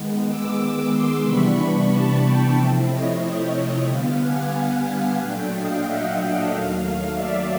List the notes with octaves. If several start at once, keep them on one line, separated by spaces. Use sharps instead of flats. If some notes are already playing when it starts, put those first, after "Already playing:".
Already playing: D#3 G#3 B3
D6 E6
C6 D6
C3 E3 G3 B3 D4 B5 C#6
A5 B5
G5 A5
C3 F3 A3 C4 E4 G5 A5
C#5 D#5
C#5 D#5
D3 G3 B3 F5 G5
F#5 G#5
F#5 G#5
A#2 F#3 A3 D4 F5 G5
D#5 F5
E5 F#5
D#2 D#3 F#3 A3 D#5 F5
D5 E5